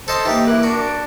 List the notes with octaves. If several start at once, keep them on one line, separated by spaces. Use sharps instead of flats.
A4 C5 D#5 A5 C6 A6
E3 A#3 D#4 G4
E4 A#4 D6 F#6
D4 F#4